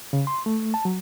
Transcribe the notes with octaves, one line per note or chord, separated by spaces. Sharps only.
C#3
C6
A3
A5
F#3